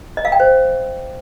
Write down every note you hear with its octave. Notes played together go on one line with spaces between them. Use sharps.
D#5
F5
G5
C5